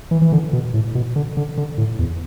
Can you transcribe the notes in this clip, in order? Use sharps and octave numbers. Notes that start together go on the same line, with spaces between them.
E3
E3
D3
B2
A2
B2
D3
D3
D3
A2
E2